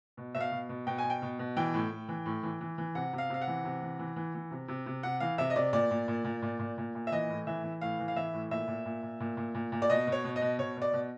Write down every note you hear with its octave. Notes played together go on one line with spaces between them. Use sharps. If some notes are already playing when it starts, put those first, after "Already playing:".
B2
B2 E5
F5
B2
B2
B2 G5
G#5
B2
G5
B2
B2
E3 G5
A2
A2
E3
A2
E3
E3
E3
C3 F#5
C3
F5
C3 F5
F#5
E3
C3
E3
E3
E3
E3
C3
C3
C3
C3 F#5
E3 F5
C3 E5
D#5
C3 D5
A#2 D5
A#2
A#2
A#2
A#2
A#2
A#2
A#2
E5
E3 D#5
A2
E3 E5
E3
A2 F5
E3
F5
E3 E5
A2
A#2 E5
A#2
A#2
A#2
A#2
A#2
A#2
A#2
D5
B2 D#5
B2
C#5
B2
D#5
B2
B2 C#5
B2 D5
B2